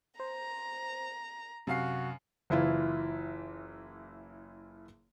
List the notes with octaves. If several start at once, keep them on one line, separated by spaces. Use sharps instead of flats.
C5 A#5
F#2 C3 F#4 F5 C7
F#1 E3 E4 F4